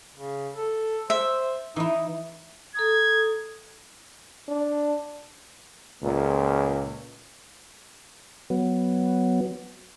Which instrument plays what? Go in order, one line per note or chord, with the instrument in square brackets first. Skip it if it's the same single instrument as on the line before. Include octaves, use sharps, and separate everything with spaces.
[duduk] C#3
A4
[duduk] C5 [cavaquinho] E5
[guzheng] E3 E4 [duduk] D#4
[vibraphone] A4 A#5 D#6 [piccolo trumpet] G#6
[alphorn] D4
[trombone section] C#2 A#2
[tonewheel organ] F#3 B3